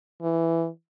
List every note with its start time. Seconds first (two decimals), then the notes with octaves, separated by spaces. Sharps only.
0.22 E3